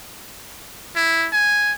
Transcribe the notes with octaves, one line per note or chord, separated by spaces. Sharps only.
E4
G#5